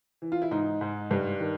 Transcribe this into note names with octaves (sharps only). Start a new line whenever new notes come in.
E3
F4
E4
G#2 D#4
G#2
G2
D#3